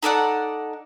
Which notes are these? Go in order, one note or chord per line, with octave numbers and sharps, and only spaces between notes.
D#4 A4 D5 F#5